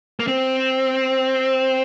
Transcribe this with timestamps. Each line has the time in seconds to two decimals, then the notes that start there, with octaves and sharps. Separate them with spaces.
0.20 A#3
0.27 C4